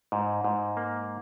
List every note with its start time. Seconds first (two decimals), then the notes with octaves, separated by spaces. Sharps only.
0.12 G#2
0.44 G#2
0.77 A#3